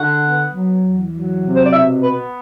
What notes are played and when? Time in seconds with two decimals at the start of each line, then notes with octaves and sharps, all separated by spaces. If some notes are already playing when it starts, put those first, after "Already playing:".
Already playing: D3 F#5
0.23 B3
0.52 F#3
0.82 E2
1.11 F#3
1.41 C3
1.54 C5
1.63 D5
1.70 B2 E5
2.00 B3 B4